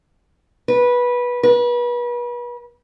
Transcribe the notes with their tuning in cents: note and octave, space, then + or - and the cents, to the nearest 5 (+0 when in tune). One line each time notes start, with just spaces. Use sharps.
B4 -15
B4 -35